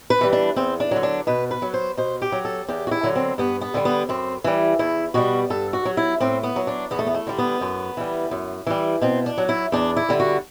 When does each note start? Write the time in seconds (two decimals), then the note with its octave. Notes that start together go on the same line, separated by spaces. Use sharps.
0.10 B4
0.21 E3 G3
0.33 D4
0.56 E2 C4
0.80 D4
0.91 D3 F#3
1.03 D4
1.27 B2 B4
1.51 B4
1.62 F#3
1.74 C5
1.97 B2 C5
2.22 G4
2.32 F#3
2.45 A4
2.68 E2 G4
2.87 F#4
2.91 E4
3.03 D3 F#3
3.16 C4
3.38 G2 B3
3.61 B3
3.74 D3 G3
3.85 B3
4.09 F#2 C4
4.44 E3 G3
4.79 E2 E4
5.14 B2 G3 F#4
5.50 G2 A4
5.73 F#4
5.85 F#3
5.97 E4
6.20 A2 C4
6.43 B3
6.56 F#3
6.67 D4
6.91 E2 B3
6.99 A3
7.07 B3
7.14 A3
7.27 D3 G3
7.39 B3
7.61 F#2
7.97 E3 G3
8.31 F#2
8.67 E3 G3
9.02 B2 C4
9.26 D4
9.38 F#3
9.49 E4
9.72 E2 D4
9.96 E4
10.09 D3 G3
10.20 F#4